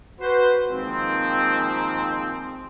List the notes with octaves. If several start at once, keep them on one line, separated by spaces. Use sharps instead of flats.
F#4 B4 C5
D#3 F3 G#3 A#3 C4